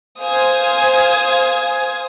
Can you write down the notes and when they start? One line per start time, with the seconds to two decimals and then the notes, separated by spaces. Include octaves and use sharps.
0.21 C5 F5 G#5 D#6 G#6